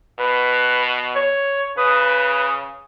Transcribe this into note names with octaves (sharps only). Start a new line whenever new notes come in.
B2 B4
C#5
C#3 B4 D#6